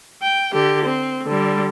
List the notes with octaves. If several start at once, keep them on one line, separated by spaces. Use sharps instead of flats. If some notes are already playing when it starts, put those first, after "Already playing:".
G5
D3 G4
C4
D3 G3